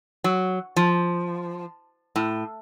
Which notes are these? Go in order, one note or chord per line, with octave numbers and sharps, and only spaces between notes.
F#3
F3
A2